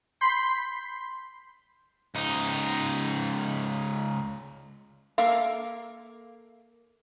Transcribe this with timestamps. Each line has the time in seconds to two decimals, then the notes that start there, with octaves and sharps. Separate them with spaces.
0.21 B5 C6 G6 B6 C7
2.15 C#2 D#4
5.18 A#3 A4 A#4 E5 F5